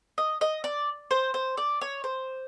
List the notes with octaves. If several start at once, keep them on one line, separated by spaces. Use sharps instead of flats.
D#5
D#5
D5
C5
C5
D5
C#5
C5